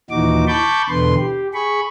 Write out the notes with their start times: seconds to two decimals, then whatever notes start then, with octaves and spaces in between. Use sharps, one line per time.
0.10 D#2 A#2 E3 D#4 F#4 D6
0.47 A5 B5 C#6 D6 G6
0.89 E2 B2 D3 B4 C6
1.18 G4
1.54 G#4 B5 C#6